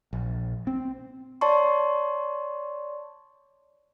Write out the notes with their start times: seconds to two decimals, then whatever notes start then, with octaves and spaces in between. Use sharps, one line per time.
0.13 A#1
0.67 C4
1.41 C#5 D5 A5 C6 C#6